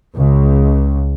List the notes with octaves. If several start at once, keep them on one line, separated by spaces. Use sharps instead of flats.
C#2